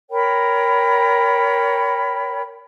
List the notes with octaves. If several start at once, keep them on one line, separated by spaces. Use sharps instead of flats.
A#4 C#5 G5 B5